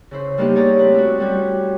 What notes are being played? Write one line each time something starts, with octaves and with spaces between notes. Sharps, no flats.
C#3 E4 C5
G3 A#3 B3 D#4 E4 G4
G#4 C#5 D5 A#5
A3 C4 B4
E4 F#4
G3 C#4 F#4